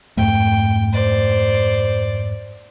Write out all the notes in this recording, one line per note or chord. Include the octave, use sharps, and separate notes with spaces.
F2 G#2 A3 G5
C5 D5